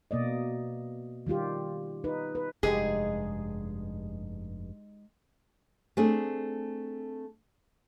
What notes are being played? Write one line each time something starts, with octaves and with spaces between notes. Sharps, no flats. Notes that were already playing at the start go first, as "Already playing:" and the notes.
B2 A#3 D5 D#5
D#3 G3 F4 G4
D#4 B4
B4
F1 G2 G#3 D#4 G4 G#4
A3 C4 D4 G#4